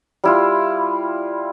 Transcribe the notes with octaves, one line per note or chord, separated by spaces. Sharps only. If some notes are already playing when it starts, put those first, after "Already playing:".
G3 E4 F4